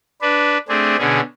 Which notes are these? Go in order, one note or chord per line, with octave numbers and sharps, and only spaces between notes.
D4 B4
A3 C4 D4 G#4
B2 D3 C#4 G#4